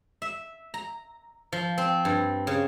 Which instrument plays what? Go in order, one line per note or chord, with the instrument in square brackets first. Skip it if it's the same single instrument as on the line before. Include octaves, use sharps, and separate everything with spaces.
[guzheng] E5
A#5
F3
C4
G2
C#3